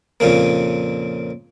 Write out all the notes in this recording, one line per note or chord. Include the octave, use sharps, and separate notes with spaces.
F2 A#2 C#3 A#3